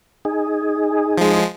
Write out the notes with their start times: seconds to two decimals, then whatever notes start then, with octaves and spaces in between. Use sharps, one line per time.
0.25 D#4 G#4
1.18 F3 G#3